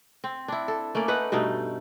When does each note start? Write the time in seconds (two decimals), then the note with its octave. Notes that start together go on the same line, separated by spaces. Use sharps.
0.24 C4
0.48 D4 E4
0.68 A4
0.95 A3 A#3 C#4 D5
1.08 D#4 B4 F#5
1.32 G2 B2 A3 D#4